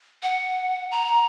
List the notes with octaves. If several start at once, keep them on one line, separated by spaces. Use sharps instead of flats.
F#5
A#5